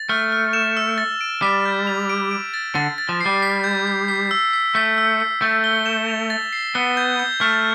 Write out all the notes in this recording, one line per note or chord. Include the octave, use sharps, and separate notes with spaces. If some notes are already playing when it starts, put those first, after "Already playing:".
Already playing: A6
A3 F6
F6
E7
E6
A6
D7
G3 B6
G6
F7
D7
D7
A6
D3 A6
A6
F3
C7
G3
B6
G6
B6
B6
E6
B6
A3 B6
E6
E6
A3 A6
G7
E7
F7
A6
C7
B3 G7
G6
G6
A3 F6